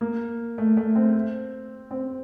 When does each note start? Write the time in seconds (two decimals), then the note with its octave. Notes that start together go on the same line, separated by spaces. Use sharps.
0.01 A#3
0.58 A3
0.77 A3
0.95 C4
1.91 C4